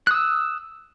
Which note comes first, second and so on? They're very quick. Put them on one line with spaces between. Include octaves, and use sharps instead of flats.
F#6 D#6 E6